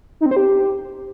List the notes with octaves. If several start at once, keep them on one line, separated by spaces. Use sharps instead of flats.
D#4
C4
C5
G4